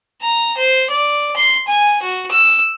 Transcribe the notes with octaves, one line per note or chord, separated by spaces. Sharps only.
A#5
C5
D5
C6
G#5
F#4
E6